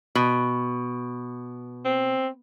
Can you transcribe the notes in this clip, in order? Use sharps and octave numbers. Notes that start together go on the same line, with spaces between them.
B2
C4